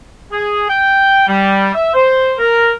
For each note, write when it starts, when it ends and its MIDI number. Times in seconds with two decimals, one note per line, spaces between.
0.31 0.68 68
0.69 1.26 79
1.27 1.69 55
1.75 1.92 76
1.94 2.33 72
2.38 2.72 70